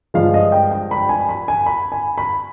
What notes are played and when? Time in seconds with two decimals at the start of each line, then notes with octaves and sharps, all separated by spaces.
0.14 G2 F3 G#3 F5
0.34 D#5
0.52 G5
0.71 G5
0.91 B5
1.09 G#5
1.29 B5
1.48 G#5
1.66 B5
1.92 G#5
2.18 B5